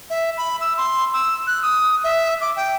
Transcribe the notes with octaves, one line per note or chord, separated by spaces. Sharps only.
E5
B5
E6
C6
E6
F#6
D#6
E5
D6
G5